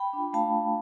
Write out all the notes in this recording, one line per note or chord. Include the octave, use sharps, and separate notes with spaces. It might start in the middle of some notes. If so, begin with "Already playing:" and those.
Already playing: G5 B5
D4 F4
A3 F5 A5